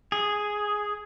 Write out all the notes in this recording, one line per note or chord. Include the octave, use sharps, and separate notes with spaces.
G#4